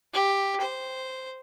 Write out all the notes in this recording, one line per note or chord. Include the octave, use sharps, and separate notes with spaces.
G4
C5